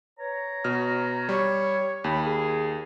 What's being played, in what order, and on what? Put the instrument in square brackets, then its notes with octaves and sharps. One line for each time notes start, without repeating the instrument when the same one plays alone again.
[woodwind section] B4 C#5 A#5
[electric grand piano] B2 F6
[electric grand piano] G3 [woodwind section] C#5
[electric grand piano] D#2 [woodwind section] B5
[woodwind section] G#4